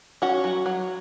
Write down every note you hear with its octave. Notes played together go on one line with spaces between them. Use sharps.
C#4 F#4
F#3
F#3